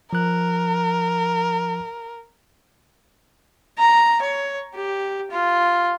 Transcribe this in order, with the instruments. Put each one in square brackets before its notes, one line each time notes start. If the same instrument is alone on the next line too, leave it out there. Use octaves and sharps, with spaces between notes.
[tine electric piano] F3 F#6 [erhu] A#4
[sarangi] A#5
C#5
G4
F4